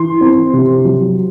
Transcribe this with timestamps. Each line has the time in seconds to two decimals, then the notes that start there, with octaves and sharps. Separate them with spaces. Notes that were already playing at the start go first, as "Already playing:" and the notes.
Already playing: E3 C6
0.21 C4
0.53 C3
0.85 F#3